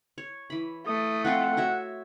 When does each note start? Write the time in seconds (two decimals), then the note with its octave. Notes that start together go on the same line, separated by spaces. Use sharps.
0.18 C#5
0.50 E3 B5
0.87 A3 D#6
1.25 F3 C4 F4 F#5
1.57 F#4 C#5 E5